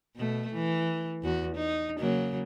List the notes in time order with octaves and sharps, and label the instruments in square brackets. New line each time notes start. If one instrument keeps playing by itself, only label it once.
[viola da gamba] B2 A3
E3
E2 F#4
D#4
C#3 F#3 A#3